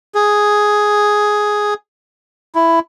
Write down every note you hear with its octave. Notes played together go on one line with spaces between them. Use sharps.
G#4
E4